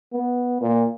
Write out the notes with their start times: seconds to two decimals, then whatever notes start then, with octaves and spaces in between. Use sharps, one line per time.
0.13 B3
0.61 A#2